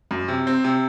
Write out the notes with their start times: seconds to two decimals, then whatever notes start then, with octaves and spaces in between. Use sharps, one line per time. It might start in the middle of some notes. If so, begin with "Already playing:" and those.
0.11 F#2
0.28 C3
0.47 C4
0.64 C3